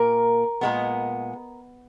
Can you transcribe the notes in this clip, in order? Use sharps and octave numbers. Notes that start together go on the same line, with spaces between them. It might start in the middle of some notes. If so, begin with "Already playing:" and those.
Already playing: A#2 A#3 A#4
A#2 G#3 B3